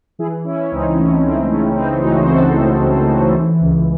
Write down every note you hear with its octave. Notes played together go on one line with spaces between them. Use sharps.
E3 E4 G#4
E3 C#4 E4
C#4
C#2 C4 D#4
C#2 A3 C#4
C#2 C4
C#3 A3 C#4
E3 C4 D#4
C#2 D#4 F#4
C5
C#2 F#4 A4
C#2
C#2
E3
E3
C#2